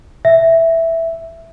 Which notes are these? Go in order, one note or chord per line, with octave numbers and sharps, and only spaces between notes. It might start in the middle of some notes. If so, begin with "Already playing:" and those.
E5